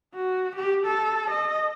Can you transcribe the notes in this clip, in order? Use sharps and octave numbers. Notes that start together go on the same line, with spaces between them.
F#4
G4
A4
D#5